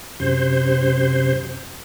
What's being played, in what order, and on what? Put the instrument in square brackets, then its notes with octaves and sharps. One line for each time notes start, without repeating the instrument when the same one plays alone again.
[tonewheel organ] F#2 C3 C5